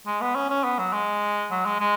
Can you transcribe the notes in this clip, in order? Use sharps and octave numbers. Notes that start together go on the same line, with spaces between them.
G#3
B3
C#4
C#4
B3
F#3
G#3
F#3
G#3
G#3